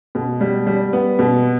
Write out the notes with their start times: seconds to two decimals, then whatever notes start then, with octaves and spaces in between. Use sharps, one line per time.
0.15 B2
0.41 G3
0.67 G3
0.93 B3
1.19 B2